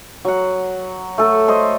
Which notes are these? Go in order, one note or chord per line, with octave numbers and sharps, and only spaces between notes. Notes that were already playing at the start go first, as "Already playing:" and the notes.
F#3 F#5
A3 A4 F#5
C5 D#5 C6